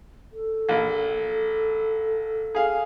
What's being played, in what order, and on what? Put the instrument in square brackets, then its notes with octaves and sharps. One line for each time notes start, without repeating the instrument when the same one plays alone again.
[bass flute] A4
[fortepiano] A#1
G#4 F5